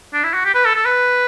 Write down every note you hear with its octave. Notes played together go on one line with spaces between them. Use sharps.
D4
E4
F#4
G4
B4
A4
A4
B4